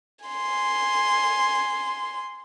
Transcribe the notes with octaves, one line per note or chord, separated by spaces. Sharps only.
G#5 C6